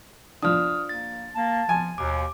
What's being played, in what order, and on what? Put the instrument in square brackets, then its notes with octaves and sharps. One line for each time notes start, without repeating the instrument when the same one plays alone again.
[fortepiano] F3 D4 [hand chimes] D#6 F6
[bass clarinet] A#3 [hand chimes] A6
[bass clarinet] A#3 [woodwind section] A5
[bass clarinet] F3 [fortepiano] G#5
[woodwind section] D#2 [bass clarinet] B2 [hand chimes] D6